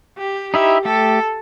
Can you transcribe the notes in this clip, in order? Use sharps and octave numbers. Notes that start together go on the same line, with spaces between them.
G4
D#4 E4 G4 E5
A3 G4 A4